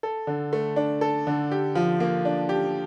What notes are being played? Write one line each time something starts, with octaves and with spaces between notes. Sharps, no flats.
A4
D3
A3
D4
A4
D3
G4
F3
A#3
D4
G4